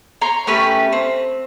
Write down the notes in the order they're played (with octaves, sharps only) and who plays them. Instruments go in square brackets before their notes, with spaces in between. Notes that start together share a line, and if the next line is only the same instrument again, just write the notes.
[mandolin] C#5 A#5 C6
A3 C#4 G4 B4
C4